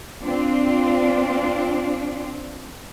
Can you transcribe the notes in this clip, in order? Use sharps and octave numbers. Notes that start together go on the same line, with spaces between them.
C4 D4 F4